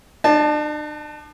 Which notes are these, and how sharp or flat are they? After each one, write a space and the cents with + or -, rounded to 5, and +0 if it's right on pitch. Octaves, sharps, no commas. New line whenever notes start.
D4 +45 A5 +0